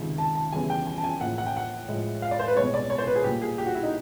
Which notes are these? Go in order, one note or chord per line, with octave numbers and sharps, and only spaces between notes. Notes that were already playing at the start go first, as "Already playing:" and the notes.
Already playing: C#2 C3 D#3
A5
A5
E2 C#3 E3 G3 G#5
G5
G#5
A5
G#5
A2 F3 A#3 F#5
F#5
G5
F#5
A2 F3 G#3
F5
D5
C5
B4
C2 B2 G#3 C#5
D5
C#5
C5
B4
G#4
A#2 G3 A#3 G4
G#4
G4
F#4
E4
D#4